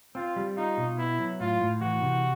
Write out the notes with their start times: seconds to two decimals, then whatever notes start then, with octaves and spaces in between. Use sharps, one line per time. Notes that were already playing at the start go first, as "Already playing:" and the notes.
0.15 C4 F4
0.36 G3
0.57 D#4 F4
0.77 B2
0.98 B3 E4
1.19 F#3
1.40 A2 F4
1.61 A2
1.81 E3 F#4
2.02 C3